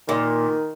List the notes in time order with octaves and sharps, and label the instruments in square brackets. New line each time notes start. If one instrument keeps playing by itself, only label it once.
[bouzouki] A#2 [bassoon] D#3